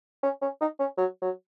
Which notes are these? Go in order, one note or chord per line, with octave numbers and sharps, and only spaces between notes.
C#4
C#4
D#4
C#4
F#3
F#3